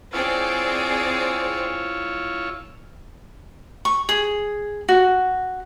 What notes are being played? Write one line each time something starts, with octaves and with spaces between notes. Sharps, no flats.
C4 E4 F4 G#4 C#5 D5
C#6
G#4
F#4